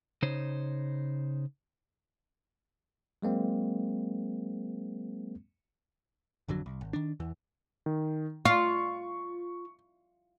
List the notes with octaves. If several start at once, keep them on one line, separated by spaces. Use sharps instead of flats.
C#3 D#4 C5 C#5
F#3 G#3 A#3 C4
G#1 F2 D3 F#3
C2
G#1
D#3 D4
E2 E3
D#3
F4 C#6